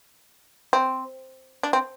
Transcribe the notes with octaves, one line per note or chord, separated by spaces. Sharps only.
C4
D4
C4